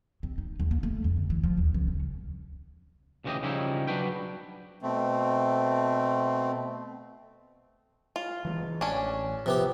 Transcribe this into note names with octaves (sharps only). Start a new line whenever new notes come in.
C4
D#4
D#2
A#3
A3
F2
D3
E3
F3
D#2
C#2
C#4
D2 C#3 E3 F#4 G4 D#5
C#3 F3 G3 C#4 D#4 E4
F#3 D4 F#4 B4 G5
B2 A3 C4
F4
E3 F3 G#3
A1 C#4 D4
C3 F3 B3 G4